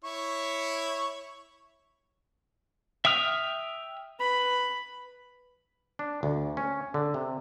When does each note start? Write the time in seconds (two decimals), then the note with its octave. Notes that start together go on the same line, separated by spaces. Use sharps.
0.04 E4 C#5 C#6
3.05 E5 G5 D#6 F6
4.20 B4 B5
5.99 D4
6.23 D2
6.57 C#4
6.94 D3
7.14 C3